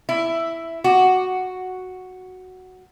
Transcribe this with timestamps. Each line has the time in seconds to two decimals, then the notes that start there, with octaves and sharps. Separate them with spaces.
0.09 E4
0.84 F#4